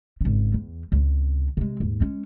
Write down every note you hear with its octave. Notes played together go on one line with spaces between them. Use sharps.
G#1 C#3
E2
C#2 C3
C3 G#3
D#2 G#2
G#3 C#4